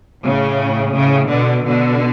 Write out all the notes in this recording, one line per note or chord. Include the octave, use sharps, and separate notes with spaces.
A2 C#3
A2 C#3
B2 D3
B2 D3